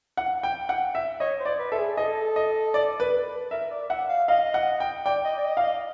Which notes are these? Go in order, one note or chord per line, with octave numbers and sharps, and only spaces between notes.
F#5
G5
F#5
E5
C#5 D#5
C5
D5
B4
A4 E5
G#4
A4 D#5
D#5
D5
B4
A#4 E5
D5
E5 F#5
F5
D#5 F5
F#5
G5
D5 G5
D#5
D5
D#5
F5
D#5